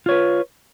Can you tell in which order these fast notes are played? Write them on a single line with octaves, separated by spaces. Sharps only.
F4 C#5 B4